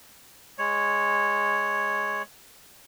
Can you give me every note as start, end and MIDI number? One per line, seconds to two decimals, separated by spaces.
0.58 2.22 56
0.58 2.22 73